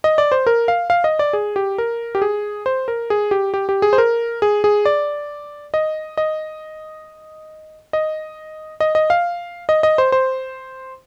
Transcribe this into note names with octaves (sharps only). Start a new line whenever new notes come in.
D#5
D5
C5
A#4
F5
F5
D#5
D5
G#4
G4
A#4
G4
G#4
C5
A#4
G#4
G4
G4
G4
G#4
C5
A#4
G#4
G#4
D5
D#5
D#5
D#5
D#5
D#5
F5
D#5
D#5
C5
C5